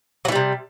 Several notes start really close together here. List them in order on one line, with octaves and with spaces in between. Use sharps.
F#3 E3 G3 C3